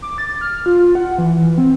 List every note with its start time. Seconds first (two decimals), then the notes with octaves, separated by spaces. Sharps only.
0.02 D6
0.18 A6
0.41 F6
0.66 F4
0.95 F#5
1.18 E3
1.58 C4